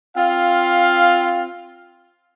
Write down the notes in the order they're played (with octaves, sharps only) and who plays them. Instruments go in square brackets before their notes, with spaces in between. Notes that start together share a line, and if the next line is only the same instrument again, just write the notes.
[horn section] C4 F4 F5